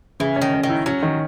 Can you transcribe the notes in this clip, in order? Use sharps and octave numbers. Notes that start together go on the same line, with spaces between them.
C#3 E3
C#4
D#3
C#4
D#3
E4
F#3 C#4
D#3